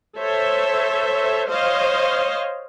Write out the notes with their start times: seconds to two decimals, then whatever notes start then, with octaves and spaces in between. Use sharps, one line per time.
0.18 A4 C5 C#5 E5
1.49 C5 C#5 D#5 F5